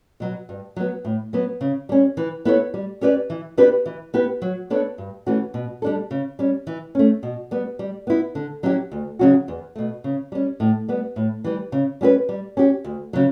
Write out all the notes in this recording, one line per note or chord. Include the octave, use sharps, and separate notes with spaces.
B2 F#3
G2
F#3 B3
A2
F#3 B3
C#3
G3 C#4
E3
B3 E4 A4 C#5
G3
C#4 G4 B4 D5
E3
B3 D4 G4 B4
E3
B3 E4 G4 B4
F#3
B3 D4 A4 C#5
G2
E3 A3 C#4 F#4
B2
G3 D4 A4
C#3
G3 C#4
E3
A3 C#4
B2
G3 B3
G3
B3 E4
D3
F#3 C#4 E4 G4
D2
C#3 F#3 C#4 F#4
E2
B2 A3
C#3
G3 C#4
A2
G3 B3
A2
E3 G3
C#3
G3 C#4 G4 B4
G3
C#4 G4
D2
C#3 F#3